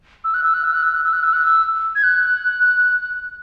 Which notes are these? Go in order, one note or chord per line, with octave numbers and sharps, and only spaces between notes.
E6
F#6
E6
F#6
E6
F#6
E6
F#6
E6
F#6
E6
F#6
E6
G#6
F#6